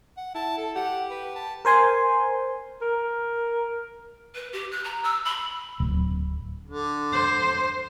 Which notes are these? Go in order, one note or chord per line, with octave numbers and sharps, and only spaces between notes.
F#5
E4 A5
A4
G4 F#5
B4
A5
A#4 C5 G#5 C6
A#4
B4
G4
F#6
A#5
E6
B5
D1
D3
C5